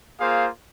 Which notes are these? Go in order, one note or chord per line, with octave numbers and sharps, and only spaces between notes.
A#3 F4 G#4 C5 F5